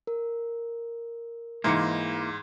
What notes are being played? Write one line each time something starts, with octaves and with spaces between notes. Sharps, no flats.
A#4
G#2 E3 A#3 D#4 C6 C#7